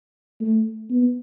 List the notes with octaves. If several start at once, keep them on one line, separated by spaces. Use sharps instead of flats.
A3
B3